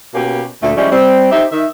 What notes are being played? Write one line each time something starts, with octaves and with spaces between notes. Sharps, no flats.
B2 A#3 C#4 G4 B4
D2 A#2 A3
F3 G3 G#3 C#4 E4
G3 C4
D#4 G4 C5 E5
D#3 E5